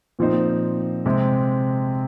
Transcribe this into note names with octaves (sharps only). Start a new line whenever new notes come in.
A#2 F3 C4 D#4 C5
C3 G#3 C4